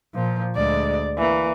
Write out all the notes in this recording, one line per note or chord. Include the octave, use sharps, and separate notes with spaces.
A#2 F3
D2 G#3 D5
E3 A#3